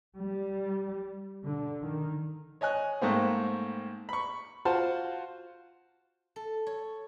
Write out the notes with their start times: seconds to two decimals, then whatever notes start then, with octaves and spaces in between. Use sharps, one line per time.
0.17 G3
1.45 D3
1.82 D#3
2.61 C#5 D#5 G#5 F#6
3.01 G#2 A3 A#3 C4
4.09 B5 C#6
4.65 F4 F#4 C5 F#5 A5
6.36 A4
6.66 C#5